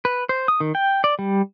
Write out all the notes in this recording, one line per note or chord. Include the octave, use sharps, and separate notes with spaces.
B4
C5
D#6
D#3
G5
D5
G3